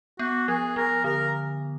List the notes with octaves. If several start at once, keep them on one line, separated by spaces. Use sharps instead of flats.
B3 F#4
F3 G#4
F3 A#4
D3 A#4